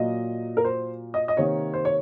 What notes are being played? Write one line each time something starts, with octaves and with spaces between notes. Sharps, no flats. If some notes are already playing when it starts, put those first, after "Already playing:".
Already playing: A#2 F#3 A#3 D#5
A#4
C5
D#5
D#5
C3 D#3 A#3 C#5
C5
C#5